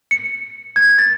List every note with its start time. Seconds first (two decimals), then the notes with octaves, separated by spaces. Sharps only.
0.11 C#7
0.76 G#6
0.98 A6